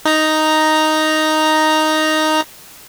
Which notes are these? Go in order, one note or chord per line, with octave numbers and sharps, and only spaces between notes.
D#4 A#5